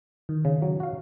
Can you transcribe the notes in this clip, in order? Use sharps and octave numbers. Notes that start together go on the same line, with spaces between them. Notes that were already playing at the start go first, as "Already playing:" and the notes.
D#3
C#3
F#3
F#4 F5